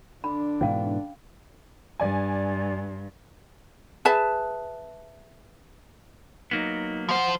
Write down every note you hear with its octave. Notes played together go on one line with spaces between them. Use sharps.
D3 D4 B5
G#2 B2 E3 C#4 F5
G2 D5 G#5
G#4 B4 E5 A5
F#3 A#3 B3 D#4
F3 C5 F#5